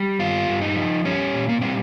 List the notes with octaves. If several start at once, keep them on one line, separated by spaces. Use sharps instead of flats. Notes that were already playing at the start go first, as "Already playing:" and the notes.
Already playing: G3
G2 F4
G2
D#4
F3
G3 C#4
A#2
A#3
G3 C4